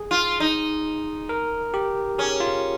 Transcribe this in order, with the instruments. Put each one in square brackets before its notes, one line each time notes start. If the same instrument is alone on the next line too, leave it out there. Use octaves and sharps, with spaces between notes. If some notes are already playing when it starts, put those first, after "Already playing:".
Already playing: [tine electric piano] G#4
[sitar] F4
D#4
[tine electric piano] A#4
G4
[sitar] C#4 [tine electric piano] G#4
[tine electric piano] F4